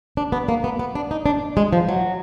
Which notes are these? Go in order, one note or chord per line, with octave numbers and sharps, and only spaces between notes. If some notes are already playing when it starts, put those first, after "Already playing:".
D4
B3
A#3
B3
B3
D4
D#4
D4
G#3
F3
F#3